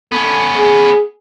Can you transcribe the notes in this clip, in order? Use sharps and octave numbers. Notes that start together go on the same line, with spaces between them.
B3 C#4 A4
G#4